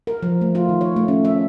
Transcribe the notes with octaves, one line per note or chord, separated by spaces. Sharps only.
A#4
F3
A3
F4
D#3
C#5
A3
C#4
E5